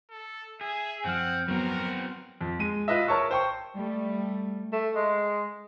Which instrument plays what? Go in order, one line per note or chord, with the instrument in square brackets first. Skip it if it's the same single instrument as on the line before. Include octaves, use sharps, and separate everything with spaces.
[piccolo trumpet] A4
[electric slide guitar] G#4 [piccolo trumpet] E5
[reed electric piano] F#2 F3 F6 [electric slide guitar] C4 [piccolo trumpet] F#5
[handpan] F#3 B3 [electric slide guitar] C4 F#4 [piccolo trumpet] A#4
[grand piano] F2
G#3 D#7
F4 B4 D#5 E5
A#4 C#5 A5 C#6 E6
C5 G5 C#6
[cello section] G3 A3
[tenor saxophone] A3
G#3